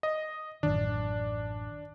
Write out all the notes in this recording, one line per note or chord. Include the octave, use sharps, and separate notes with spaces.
D#5
A1 F#2 D#3 D4